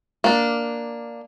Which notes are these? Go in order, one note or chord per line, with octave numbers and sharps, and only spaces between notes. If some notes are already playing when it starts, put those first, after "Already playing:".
A#3 D4